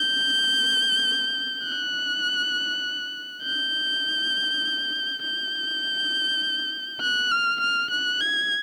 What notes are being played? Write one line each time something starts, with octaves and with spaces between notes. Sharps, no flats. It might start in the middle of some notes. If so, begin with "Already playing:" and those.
Already playing: G6
F#6
G6
G6
F#6
F6
F6
F#6
G#6